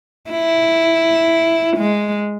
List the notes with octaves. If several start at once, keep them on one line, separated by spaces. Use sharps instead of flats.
E4
G#3